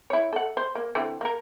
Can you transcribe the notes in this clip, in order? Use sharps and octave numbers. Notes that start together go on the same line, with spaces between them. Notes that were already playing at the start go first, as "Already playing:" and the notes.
E4 C#5
A4 F#5
C5
A#3
D3 E3 C4
A#3 A#4